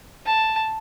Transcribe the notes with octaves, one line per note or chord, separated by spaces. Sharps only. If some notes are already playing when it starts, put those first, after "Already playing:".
A5